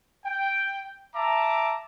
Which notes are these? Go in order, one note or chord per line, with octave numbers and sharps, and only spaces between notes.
G5
E5 A5 A#5 D6